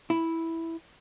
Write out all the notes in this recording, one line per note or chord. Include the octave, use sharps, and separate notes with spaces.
E4